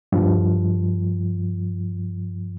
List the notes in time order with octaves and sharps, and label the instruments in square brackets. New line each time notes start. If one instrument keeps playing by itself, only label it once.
[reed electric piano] G2 F3